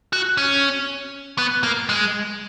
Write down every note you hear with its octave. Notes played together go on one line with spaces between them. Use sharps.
F#4
C#4
B3
A#3
G#3